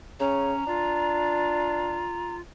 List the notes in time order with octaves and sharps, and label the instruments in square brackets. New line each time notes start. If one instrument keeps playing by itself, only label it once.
[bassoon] C#3 [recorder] C#4 [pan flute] A#5
[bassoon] D4 [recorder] F4